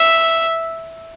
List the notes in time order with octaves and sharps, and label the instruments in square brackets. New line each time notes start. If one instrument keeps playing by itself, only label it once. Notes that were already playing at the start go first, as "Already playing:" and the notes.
Already playing: [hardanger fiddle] E5